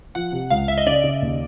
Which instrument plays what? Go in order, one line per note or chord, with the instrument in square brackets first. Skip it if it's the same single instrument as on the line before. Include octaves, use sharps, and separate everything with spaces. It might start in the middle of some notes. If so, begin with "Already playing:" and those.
[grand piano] F3 [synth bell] F#5
[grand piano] C3
[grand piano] C#2 [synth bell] F5
[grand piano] C#2 [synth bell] E5
[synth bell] D#5
[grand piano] C#3 [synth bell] D5
[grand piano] C#3
D#2